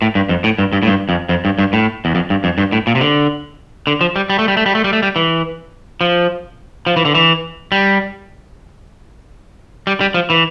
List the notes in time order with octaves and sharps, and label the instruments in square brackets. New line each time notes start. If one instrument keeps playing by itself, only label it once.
[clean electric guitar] A2
G2
F2
A2
G2
G2
A2
G2
F2
F2
G2
G2
A2
E2
F2
G2
F2
G2
A2
A#2
C3
D3
D3
F3
G3
G3
A3
G3
A3
G3
A3
G3
A3
G3
E3
F3
F3
E3
D3
E3
G3
G3
G3
F3
E3